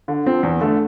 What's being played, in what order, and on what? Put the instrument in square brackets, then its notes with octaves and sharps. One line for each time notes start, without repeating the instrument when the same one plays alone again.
[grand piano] D3
F3 C4
E2
D3 A3